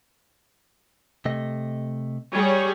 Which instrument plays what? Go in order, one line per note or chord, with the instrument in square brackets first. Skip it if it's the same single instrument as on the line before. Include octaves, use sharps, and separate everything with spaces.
[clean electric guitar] C3 A3 D#5
[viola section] G3 G#4 [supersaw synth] C#5